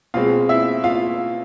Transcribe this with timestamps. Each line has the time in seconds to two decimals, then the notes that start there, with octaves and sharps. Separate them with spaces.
0.14 B2 G#3 C4 F4 F5
0.49 E4 E5
0.84 F4 F5